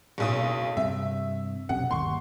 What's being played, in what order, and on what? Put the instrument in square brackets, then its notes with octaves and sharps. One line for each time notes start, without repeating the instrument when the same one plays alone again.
[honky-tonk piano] F#1 B1 D#6
[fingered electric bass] G2 C3 [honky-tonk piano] E5
[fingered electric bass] B1 F#2 C3 [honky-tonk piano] F#5
[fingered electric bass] G1 D#2 [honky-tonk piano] C6 C#6